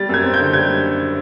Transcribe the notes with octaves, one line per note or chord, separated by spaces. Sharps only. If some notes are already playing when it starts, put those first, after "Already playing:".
Already playing: G3 A6
F#2 G#6
C4
G6
D3
G3 G#6